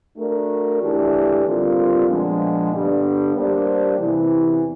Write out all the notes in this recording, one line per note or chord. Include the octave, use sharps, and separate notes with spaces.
A3 D4 F#4 A#4
E3 A3 D4 G4
D3 G3 C4 F4 A#4
A#2 F3 G#3 B3 D4
G2 D3 G3 B3 D4
G3 A#3 D4 G4 C5
E2 C3 E3